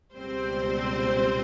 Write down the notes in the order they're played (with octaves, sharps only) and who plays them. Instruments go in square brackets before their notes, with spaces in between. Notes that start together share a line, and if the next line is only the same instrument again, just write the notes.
[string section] C#2 B2 G3 C4 C5